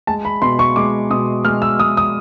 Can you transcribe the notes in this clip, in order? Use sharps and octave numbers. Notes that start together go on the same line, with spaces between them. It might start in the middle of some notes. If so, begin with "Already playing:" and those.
G#3 A5
B5
B2 C6
C#6
G#3 D6
B2 D#6
G#3 F6
E6
G#3 D#6
D#6